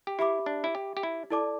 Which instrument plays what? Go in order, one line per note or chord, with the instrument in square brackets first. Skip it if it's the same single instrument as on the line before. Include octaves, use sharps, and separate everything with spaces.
[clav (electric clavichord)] G4
[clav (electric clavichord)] E4 [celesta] G4 E5 B5 D6
[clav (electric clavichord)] D4
E4
G4
G4
E4
[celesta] E4 A4 D5 A5 D6